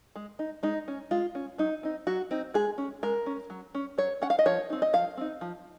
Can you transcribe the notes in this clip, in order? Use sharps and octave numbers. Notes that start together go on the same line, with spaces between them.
G#3
D#4
G#3 D#4
C#4
G#3 F4
C#4
F#3 D#4
C4 D#4
F#3 F#4
C4 D#4
G#3 G#4
C#4
G#3 A#4
C#4
F#3
C#4
F#3 C#5
C#4 F#5
F5
D#5
F3 C#5
C4 D#4
D#5
F3 F5
C4 D#4
F3